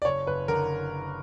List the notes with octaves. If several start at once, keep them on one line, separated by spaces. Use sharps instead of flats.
D5
F#1 C#5
F#1 B4
D3 A#4